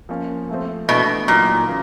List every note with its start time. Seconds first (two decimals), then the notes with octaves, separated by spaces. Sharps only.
0.09 F3 A#3 C#4
0.49 F3 A3 C4
0.88 B2 E3 A3 D4 F#4
1.27 A#2 F#3 A#3 D#4
1.67 C#3 E3